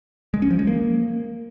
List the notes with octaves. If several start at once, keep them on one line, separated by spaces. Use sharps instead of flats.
G#3
C#4
F3
G#3
A#3